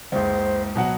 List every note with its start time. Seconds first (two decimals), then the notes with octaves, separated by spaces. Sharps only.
0.12 F#1 C#2 C5
0.75 B2 F#3 F#5